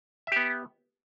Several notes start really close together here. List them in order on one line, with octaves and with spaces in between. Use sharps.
E5 G4 B3